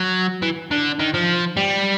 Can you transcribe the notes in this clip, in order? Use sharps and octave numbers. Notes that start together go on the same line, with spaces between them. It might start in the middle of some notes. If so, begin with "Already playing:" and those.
Already playing: F#3
E3
D3
D#3
F3
G3